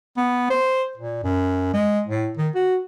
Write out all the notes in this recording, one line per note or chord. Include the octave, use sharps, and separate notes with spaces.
B3
C5
A#2
F#2
G#3
A2
D#3
F#4